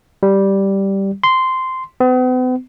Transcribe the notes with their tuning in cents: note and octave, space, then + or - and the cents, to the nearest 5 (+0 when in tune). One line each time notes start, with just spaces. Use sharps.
G3 -5
C6 -10
B3 +45